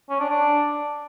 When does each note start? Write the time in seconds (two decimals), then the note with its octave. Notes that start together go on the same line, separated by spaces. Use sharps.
0.10 C#4
0.20 D4
0.30 D4